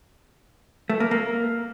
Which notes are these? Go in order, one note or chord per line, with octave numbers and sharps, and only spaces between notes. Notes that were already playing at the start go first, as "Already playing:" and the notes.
A3
A#3
A#3